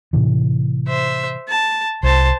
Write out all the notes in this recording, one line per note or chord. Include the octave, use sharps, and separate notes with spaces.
A2 C3 E3
C5 E5
A5
C2 C5 A5